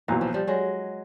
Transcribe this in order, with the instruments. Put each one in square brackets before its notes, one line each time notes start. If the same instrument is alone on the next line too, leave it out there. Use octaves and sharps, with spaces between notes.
[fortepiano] B1 A#2 F#3 [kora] E3
[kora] F3
F3 G3
F#3 G#3